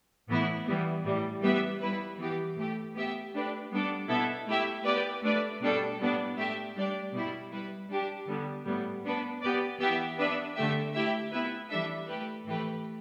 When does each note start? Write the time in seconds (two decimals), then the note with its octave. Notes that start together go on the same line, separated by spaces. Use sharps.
0.28 A2 E3 B3 E4
0.66 E3 G3 B3
1.04 A2 E3 G3
1.42 G3 B3 G4 B4 E5
1.81 G3 E4 B4
2.18 E3 B3 G4
2.57 A2 A3 G4
2.94 B3 G4 E5
3.33 A3 D4 G4 B4
3.71 G3 B3 D4 A4 D5
4.08 B2 B3 E4 A4 E5
4.47 A3 E4 G4 E5
4.84 B3 G4 B4 D5
5.22 A3 D4 B4 D5
5.60 B2 G3 D4 A4
5.98 A2 G3 B3 D4
6.37 A3 G4 E5
6.75 G3 D4 G4 D5
7.13 B2 G3 E4
7.51 G3 E4 B4
7.89 G3 D4 G4
8.28 D3 G3 B3
8.66 A2 G3 B3
9.04 B3 D4 B4
9.42 B3 G4 B4 D5
9.80 E3 B3 G4 E5
10.18 B3 D4 B4 E5
10.57 D3 A3 G4 E5
10.94 A3 E4 G4 E5
11.31 B3 E4 B4 E5
11.70 E3 G3 D4 A4 E5
12.08 A3 G4 B4
12.46 A2 E3 A3 G4 B4